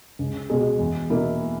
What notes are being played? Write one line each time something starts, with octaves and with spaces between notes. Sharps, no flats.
C#2
B2 G#3
E2
B2 A#3 E4